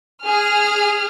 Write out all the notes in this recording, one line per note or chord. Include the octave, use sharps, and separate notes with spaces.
G#4 F6